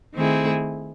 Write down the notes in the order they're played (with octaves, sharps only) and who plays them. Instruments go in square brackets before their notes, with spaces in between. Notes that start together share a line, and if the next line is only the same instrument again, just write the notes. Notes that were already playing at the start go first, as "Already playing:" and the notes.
[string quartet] D#3 A3 C4 E4 G#4